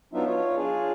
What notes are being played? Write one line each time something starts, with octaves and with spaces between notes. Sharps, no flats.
F#3 B3 D4 D#4 F4 E5
F4 C#5
D4 F4 G#4